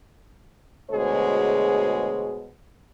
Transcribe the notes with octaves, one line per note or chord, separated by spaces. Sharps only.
D2 B2 G#3 G#4 C5 C#5